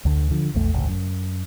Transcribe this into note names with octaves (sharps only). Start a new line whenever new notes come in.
D2 D3
D3 F3
A#1 E2 A3
G#1 C#2 A2
F#2